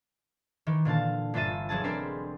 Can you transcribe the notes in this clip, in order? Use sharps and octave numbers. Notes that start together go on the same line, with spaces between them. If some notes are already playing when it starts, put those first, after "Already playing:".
D#3 E3
A#2 D3 F5 A5
G1 D4 F4 E5 A6 D#7
E1 F#3 G#4 A5
C4 D4 A#4 D5 B5 C6